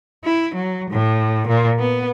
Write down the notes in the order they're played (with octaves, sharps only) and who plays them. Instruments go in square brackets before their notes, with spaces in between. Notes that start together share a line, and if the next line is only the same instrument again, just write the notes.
[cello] E4
F#3
A2
A#2
B3